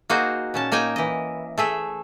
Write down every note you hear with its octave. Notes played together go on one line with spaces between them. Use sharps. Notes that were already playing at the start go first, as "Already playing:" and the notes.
A#3 D#4 F#4 G#4 C5
A#2 C#4 A5
A#3 D#4 G5 G#5
E3 D#5
A3 G#4 E5